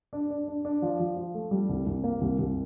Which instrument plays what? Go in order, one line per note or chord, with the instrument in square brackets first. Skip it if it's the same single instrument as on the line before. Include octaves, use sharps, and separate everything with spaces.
[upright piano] D4
D4
D4
D4
F3
F3
F3
A3
G3
C2
C2
A#3
C2
C2